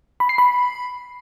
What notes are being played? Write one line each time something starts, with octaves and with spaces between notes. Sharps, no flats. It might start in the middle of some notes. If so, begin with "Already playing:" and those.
B5
C7
B5